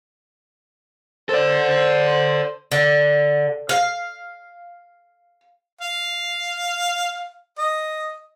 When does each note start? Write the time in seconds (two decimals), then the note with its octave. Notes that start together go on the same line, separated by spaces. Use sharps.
1.29 A4 C5 D5
2.72 D3
3.69 F5
5.81 F5
7.59 D#5